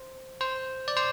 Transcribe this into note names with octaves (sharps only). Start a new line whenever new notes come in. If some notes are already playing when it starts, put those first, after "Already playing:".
Already playing: C5
C5
D5
C5